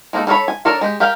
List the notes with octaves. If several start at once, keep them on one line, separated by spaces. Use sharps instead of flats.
G#3 A#3 D#4 E4 A4
G3 A4 A#4 C#5 B5
G#5
D4 A4 A#4 C#5 D5
G#3 G4
G4 A#4 F5 G5